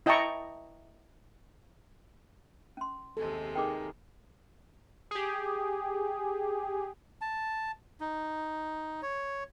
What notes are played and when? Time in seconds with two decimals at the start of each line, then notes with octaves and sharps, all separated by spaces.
0.06 E4 D#5 G5 A5 A#5 C#6
2.77 C#4 C6
3.17 D#2 C3 G#3 A4
3.55 D#4 G#4 A#4 G5 D6
5.11 G4 G#4
7.21 A5
8.00 D#4
9.02 C#5